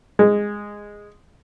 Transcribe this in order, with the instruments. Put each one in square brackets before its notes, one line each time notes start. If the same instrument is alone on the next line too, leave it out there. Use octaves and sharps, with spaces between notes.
[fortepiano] G#3